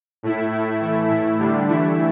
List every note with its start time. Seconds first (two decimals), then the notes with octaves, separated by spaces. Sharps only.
0.23 A2 A3 E4
0.52 A2 A3 E4
0.81 E3 A3 E4
1.09 A2 A3 E4
1.39 D3 G3 D4
1.68 E3 A3 E4